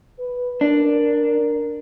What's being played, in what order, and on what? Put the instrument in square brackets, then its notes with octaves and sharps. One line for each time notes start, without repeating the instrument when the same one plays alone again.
[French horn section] B4
[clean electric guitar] D4 [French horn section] A#4